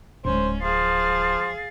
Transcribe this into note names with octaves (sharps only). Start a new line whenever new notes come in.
D1 G#2 C#4 C5
F3 G#4 F5 A6